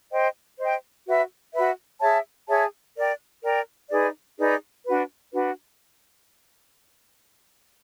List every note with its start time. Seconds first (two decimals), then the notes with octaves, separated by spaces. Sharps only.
0.11 C5 D#5 G5
0.59 C5 D#5 G5
1.06 F#4 B4 E5
1.53 F#4 B4 E5
2.01 G#4 C#5 E5 A5
2.48 G#4 C#5 E5 A5
2.96 A#4 D5 G5
3.43 A#4 D5 G5
3.91 D#4 G#4 B4 D5
4.38 D#4 G#4 B4 D5
4.86 D4 F#4 B4
5.33 D4 F#4 B4